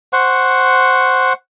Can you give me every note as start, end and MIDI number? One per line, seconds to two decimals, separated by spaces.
0.13 1.33 72
0.13 1.33 78
0.13 1.33 85